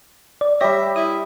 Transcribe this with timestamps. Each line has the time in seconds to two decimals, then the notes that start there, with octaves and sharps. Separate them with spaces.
0.41 D5
0.61 G3 G4 C#5 E5 A#6
0.96 E4 D#6